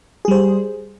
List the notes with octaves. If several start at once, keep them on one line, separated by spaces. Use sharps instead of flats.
G3 G#4 C5